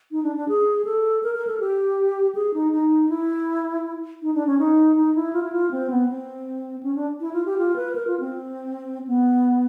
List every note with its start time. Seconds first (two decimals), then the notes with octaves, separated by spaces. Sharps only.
0.11 D#4
0.23 D4
0.36 D4
0.48 G#4
0.85 A4
1.23 A#4
1.35 A#4
1.47 A4
1.60 G4
2.35 G#4
2.54 D#4
2.72 D#4
3.09 E4
4.22 D#4
4.34 D4
4.47 C#4
4.59 D#4
4.97 D#4
5.15 E4
5.33 F4
5.43 E4
5.52 F4
5.71 C4
5.90 B3
6.09 C4
6.83 C#4
6.95 D4
7.21 E4
7.33 F4
7.46 G4
7.58 F4
7.76 B4
7.96 A#4
8.07 F4
8.20 C4
9.07 B3